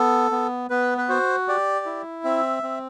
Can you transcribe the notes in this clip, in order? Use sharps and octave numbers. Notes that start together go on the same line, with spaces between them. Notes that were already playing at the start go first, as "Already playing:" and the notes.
Already playing: B3 A4
B3
B3 B4
B4
F#4 C5
G4 D5
E4
C4 E5
C4